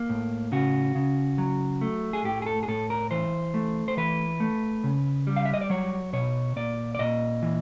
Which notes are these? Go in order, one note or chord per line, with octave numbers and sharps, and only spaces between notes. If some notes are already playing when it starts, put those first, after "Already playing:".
Already playing: A#3
A2
C#3 F#4
C#3
F#3
A3
G#4
A2 G4
G#4
A4
G#4
A2 A4
A#4
E3 C5
A3
C5
E3 B4
A3
C#3
G3
F5
E5
D#5
D5
F#3 C#5
B2 C#5
A#2 D5
D5
A#2 D#5
E3